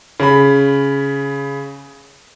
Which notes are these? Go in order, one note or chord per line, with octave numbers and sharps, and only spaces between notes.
C#3 B5